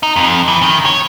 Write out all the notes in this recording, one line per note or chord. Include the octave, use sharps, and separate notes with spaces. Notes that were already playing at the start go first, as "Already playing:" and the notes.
D#4
F2
E3
D#3
C#5